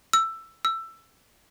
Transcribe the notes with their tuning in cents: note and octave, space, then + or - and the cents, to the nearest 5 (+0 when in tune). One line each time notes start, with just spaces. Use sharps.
E6 +10
E6 +15